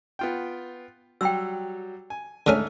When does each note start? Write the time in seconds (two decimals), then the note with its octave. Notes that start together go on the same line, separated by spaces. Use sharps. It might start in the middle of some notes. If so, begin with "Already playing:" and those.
0.19 B3 F4 G5
1.21 F#3 G3 G5 C6 E6
2.10 G#5
2.47 G#2 D3 A3 C#4 E5 F6